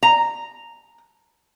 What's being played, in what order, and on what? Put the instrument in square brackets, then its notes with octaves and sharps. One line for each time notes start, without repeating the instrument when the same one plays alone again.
[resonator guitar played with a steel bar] A#5